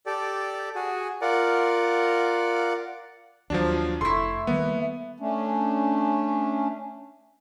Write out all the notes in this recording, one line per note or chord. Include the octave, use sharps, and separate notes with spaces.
G4 A4 D5
F#4 G#4
F4 A#4 D5 F#5
D#2 F3 F#3 D4
F1 A3 E4 C6
D#3 G3 A#3 B3
A3 C#4 D4